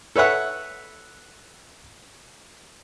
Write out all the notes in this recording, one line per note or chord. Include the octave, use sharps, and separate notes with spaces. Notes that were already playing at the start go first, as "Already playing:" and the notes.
A4 B4 C#5 E5 F#5